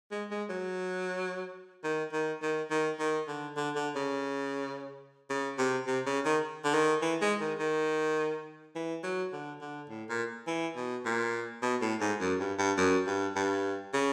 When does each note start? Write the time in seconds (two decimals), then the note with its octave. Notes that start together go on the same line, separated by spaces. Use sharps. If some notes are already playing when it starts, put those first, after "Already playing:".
0.12 G#3
0.31 G#3
0.50 F#3
1.84 D#3
2.12 D#3
2.42 D#3
2.71 D#3
3.00 D#3
3.28 D3
3.57 D3
3.76 D3
3.96 C#3
5.30 C#3
5.59 C3
5.87 C3
6.06 C#3
6.25 D#3
6.65 D3
6.74 D#3
7.02 E3
7.22 G#3
7.41 D#3
7.59 D#3
8.75 E3
9.04 F#3
9.33 D3
9.61 D3
9.90 A2
10.10 A#2
10.47 E3
10.76 B2
11.05 A#2
11.62 B2
11.82 A2
12.01 G#2
12.21 F#2
12.40 G2
12.58 G2
12.78 F#2
13.07 G2
13.36 G2
13.94 C#3